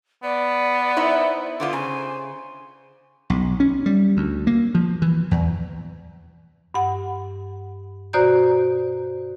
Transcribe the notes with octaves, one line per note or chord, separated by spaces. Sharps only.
B3 D5
D#4 E4 C5
D3 B3 F4 C5
C#3 G#5
B1
C#4
G3
D2
A#3
F3
E3
E2
G2 F#5
B2 F#4 C5 D5 A#5 G6